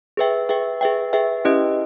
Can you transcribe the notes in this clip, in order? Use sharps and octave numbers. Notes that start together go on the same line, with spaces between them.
G#4 B4 E5 G5
G#4 B4 E5 G5
G#4 B4 E5 G5
G#4 B4 E5 G5
C#4 E4 G4 B4 D#5